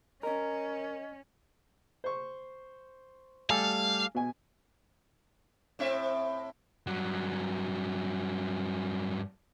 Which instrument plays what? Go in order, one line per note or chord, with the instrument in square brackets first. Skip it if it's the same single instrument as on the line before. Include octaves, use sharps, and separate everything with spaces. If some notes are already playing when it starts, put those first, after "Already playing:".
[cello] C#4 [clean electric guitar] A#4 [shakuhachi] D#5
[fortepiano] C5 C#6
[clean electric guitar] G3 A3 A4 [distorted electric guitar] F5 [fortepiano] G#5
[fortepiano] B2 G#5
[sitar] A2 C4 E5
[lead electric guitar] G2 F#3